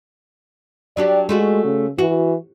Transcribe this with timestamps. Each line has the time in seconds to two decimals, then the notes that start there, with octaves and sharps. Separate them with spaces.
0.97 F#3 D4 G4 D5
1.29 G#3 A3 F4 F#4
1.65 C#3
1.99 E3 F#4